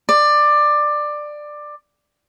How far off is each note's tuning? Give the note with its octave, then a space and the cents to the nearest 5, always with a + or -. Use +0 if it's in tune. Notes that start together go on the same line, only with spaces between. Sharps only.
D5 +15